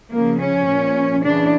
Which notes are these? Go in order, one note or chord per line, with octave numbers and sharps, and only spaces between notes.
C#3 F3 A#3
C#4
A#2 F3
C#3 E3 D4